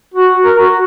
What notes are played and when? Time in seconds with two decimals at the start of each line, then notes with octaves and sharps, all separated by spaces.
0.14 F#4
0.43 A#4
0.58 F#4